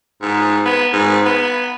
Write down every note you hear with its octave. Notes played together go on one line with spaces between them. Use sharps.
G#2
B3
G#2
B3